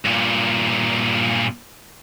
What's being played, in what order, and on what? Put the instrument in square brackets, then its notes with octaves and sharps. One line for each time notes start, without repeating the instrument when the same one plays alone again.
[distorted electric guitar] G2 A#2